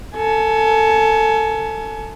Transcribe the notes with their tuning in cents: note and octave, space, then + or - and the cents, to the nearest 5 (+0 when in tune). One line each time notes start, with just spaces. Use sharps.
A4 +20 G#5 +30